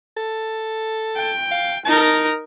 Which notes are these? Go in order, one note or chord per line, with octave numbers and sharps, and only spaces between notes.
A4
G5
F5
D#4 A#4 A5